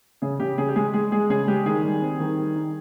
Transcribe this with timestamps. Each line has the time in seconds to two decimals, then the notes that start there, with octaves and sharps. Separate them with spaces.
0.22 C#3 G#4
0.40 C#3 G4
0.58 C#3 G#4
0.68 G4
0.76 G#3 G#4
0.94 G#3 G#4
1.12 G#3 G#4
1.30 C#3 G#4
1.48 G#3 G4
1.66 D#3 G#4
1.83 G3
2.02 C4
2.20 D#3
2.37 G3
2.56 D#4